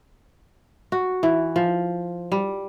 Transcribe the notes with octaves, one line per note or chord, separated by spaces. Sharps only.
F#4
E3
F3
G3